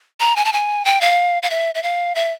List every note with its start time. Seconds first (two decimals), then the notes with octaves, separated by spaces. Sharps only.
0.20 A#5
0.36 G#5
0.45 A5
0.53 G#5
0.85 G5
1.01 F5
1.43 F5
1.50 E5
1.75 E5
1.83 F5
2.15 E5